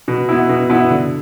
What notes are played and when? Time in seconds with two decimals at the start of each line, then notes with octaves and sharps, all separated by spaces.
0.08 B2
0.29 B3 E4
0.49 B2
0.70 B3 E4
0.90 D3